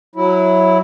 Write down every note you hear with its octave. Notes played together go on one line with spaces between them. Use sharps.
F#3 E4